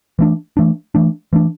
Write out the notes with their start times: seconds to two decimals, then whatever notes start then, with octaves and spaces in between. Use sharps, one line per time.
0.19 E3 A3 D4
0.57 E3 A3 D4
0.95 E3 A3 D4
1.33 E3 A3 D4